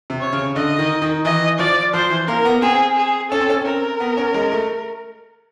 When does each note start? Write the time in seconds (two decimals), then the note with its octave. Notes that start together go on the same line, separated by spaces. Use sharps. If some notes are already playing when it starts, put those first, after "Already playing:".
0.10 C3
0.21 C#5
0.33 C#3
0.56 D3 D#5
0.79 D#3
1.02 D#3
1.25 E3 D#5
1.59 F3 D5
1.94 F3 C5
2.10 E3
2.27 A#3 A#4
2.45 B3
2.62 C4 G#4
2.97 G#4
3.31 C#4 A4
3.40 C4
3.50 C#4
3.66 C4 A#4
4.00 B3
4.17 C#4
4.34 G#3
4.52 A3